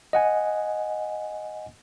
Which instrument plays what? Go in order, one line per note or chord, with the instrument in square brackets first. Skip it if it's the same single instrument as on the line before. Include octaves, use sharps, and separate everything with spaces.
[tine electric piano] D#5 F#5 G#5